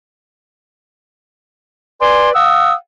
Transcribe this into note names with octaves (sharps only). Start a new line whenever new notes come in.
B4 D5 G#5 C6
F5 F#5 D#6 E6